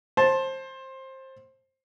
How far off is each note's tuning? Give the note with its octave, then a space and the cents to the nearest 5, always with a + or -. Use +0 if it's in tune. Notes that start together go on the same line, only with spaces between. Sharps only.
C5 +20 A5 +0